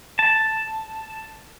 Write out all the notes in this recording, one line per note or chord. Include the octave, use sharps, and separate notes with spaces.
A5